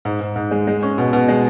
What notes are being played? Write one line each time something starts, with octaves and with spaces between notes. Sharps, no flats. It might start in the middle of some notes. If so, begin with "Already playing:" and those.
G#2
G#2
G#2
G#3
G#3
C#4
B2
B2
G#3